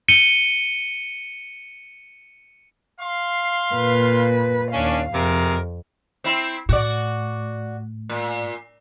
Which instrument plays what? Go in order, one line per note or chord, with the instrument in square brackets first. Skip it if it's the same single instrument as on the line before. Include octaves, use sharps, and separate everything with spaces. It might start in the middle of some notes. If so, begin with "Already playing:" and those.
[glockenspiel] C#7 D#7 G7
[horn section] F5 C6
[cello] A#2 B4
[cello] D#2 F5 [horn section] C#4 D4
[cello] F2 [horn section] C3 G#4 A#4
[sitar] C4 E4
[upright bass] A2 [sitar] F#4 D5
[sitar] A#2